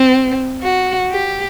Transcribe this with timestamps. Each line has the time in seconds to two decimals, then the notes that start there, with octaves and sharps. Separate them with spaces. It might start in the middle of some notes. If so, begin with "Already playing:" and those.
Already playing: C4
0.63 F#4
1.11 G4